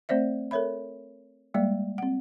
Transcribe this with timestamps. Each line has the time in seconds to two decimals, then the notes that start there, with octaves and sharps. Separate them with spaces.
0.09 A3 C4 C5 D5 E5
0.51 A4 A#4 C#5 E5 B5
1.54 G3 G#3 A#3 D5
1.98 C4 F#5